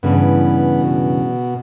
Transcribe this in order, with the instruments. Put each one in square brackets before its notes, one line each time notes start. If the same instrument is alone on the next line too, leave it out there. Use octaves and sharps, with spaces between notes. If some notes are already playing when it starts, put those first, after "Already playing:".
[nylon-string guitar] G2 C#3 E3 [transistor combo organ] B3
[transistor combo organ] B2